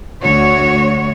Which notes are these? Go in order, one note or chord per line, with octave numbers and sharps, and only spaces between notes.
D2 F#4 C#5